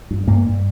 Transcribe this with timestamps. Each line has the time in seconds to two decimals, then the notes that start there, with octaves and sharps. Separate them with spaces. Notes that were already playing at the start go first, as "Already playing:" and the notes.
0.11 G2
0.27 G2 A#3
0.46 G2